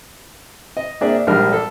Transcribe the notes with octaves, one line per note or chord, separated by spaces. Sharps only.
D#5
A#3 C4 D4 G#4 D5 E5
E5
A#1 G#2 G3 D4 A#4 F6
A4